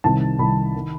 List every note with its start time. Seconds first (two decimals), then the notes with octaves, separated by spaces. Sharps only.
0.04 C2 C3 D#3 A5
0.39 C2 C3 D#3 B5
0.76 D#3